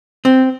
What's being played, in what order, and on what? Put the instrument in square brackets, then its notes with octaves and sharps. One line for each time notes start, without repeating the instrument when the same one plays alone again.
[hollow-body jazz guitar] C4